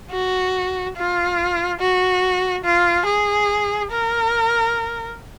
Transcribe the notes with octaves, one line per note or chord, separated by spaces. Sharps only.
F#4
F4
F#4
F4
G#4
A#4